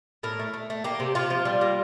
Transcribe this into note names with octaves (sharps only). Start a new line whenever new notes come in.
A2 A#4
A3
A3
A3
A#3 G4
C3
C3 F4
F3
G3
A#3